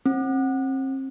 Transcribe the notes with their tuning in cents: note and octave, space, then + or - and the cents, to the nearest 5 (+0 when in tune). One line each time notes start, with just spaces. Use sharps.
C4 +35